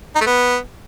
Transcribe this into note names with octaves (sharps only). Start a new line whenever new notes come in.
D#4
A3
B3